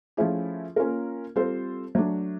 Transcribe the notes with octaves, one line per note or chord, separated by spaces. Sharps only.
F3 A3 C#4 E4 G#4
A#3 C#4 F4 A#4
G3 C4 F4 A4 C5
F#3 A3 D4